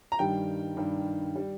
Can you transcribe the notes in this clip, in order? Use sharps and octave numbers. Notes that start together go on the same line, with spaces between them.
A#5
G2 D#3 G3 G5
G2 D#3 G3
G3